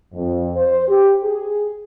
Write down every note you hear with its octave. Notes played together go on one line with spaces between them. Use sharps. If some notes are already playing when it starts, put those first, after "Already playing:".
F2
C5
G4
G#4